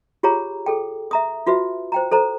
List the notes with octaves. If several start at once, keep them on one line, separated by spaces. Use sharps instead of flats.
F4 G4 G#4 C#5 A#5
G#4 A4 G5
E5 A#5 D#6
F4 F#4 B4 E5
C5 G5 A#5
A4 C5 A#5